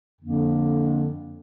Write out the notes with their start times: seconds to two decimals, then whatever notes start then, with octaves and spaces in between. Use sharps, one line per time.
0.20 F2 D3 F3 A#3 D4